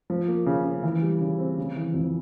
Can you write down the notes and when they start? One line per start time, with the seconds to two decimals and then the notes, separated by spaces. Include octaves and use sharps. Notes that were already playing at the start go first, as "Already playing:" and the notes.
0.10 F3
0.28 A#3
0.46 C#3
0.64 C#3
0.83 E3
1.02 G3
1.20 C#3
1.38 C4
1.57 C#3
1.76 E3
1.94 F2